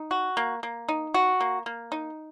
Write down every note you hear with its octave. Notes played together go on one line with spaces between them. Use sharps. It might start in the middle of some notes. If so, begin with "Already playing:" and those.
Already playing: D#4
F#4
A#3
A#3
D#4
F#4
A#3
A#3
D#4